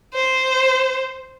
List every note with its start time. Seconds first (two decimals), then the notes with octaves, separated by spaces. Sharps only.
0.14 C5